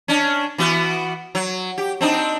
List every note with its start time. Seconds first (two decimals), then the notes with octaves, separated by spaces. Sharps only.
0.08 C#4 D4
0.58 E3 B3 F#4
1.35 F#3
1.78 G4
2.01 C4 D4 D#4